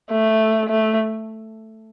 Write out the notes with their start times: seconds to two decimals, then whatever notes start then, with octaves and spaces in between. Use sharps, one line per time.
0.11 A3
0.69 A3